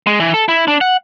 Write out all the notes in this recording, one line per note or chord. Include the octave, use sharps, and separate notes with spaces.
G#3
E3
A4
E4
D4
F#5